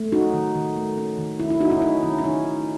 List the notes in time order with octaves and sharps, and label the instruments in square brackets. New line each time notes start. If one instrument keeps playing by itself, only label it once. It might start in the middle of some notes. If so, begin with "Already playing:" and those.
Already playing: [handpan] A3
C#4 D#4 F#4
D#3
D#3
A3
C#4
D#3
D#3 C#4 E4
C#4 E4
A3 D#4 F#4
C#4 E4
C#4 D#4
D#3 C#4
C#4
D#3 D#4
A3